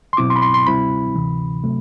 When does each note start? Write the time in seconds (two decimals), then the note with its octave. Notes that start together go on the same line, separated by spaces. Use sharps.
0.13 C6
0.17 B2 F#3 C4 E4 D6
0.30 C6
0.36 B5
0.42 C6
0.54 C6
0.67 D2 C3 G3 C4 E4 B5
1.15 D2 C3 E3
1.64 C3 F#3 A3